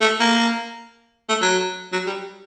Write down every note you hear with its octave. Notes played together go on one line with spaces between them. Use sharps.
A3
A#3
A3
F#3
F#3
G3